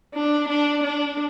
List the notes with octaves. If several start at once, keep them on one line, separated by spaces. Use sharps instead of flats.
D4
D4
D4